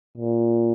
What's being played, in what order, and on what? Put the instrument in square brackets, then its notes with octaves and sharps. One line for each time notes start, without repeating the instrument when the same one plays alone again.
[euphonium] A#2